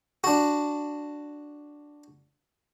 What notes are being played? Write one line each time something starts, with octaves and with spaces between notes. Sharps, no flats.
D4 F#4